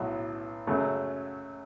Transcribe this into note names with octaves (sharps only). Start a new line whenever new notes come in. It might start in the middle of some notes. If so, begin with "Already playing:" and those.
Already playing: B1 A2 F#3
F#2 C#3 F#3 A3